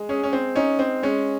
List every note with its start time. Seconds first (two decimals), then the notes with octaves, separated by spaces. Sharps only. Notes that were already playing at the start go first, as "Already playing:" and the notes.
Already playing: G#3
0.09 C#4 G#4
0.23 C#4
0.33 C4
0.56 C#4 D#4
0.79 C4
1.03 G#3 C#4